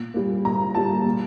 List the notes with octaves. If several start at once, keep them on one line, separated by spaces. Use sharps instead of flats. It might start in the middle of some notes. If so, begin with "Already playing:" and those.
Already playing: A#2
G3 A#3
A#2 A#5
G3 A#3 A5
A#2